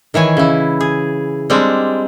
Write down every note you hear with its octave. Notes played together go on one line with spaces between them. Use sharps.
D#3 E3 C#5 G#5
C#3 E4
G#4
G3 G#3 C4 D4